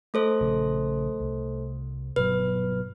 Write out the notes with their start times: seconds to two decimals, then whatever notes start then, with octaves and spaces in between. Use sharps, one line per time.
0.14 A3 A4 C5
0.40 A#1 C#3
1.20 C2
2.16 G1 B2 F#3 B4